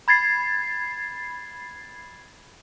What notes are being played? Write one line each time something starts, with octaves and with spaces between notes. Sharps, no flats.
B5 G#6 A6 C7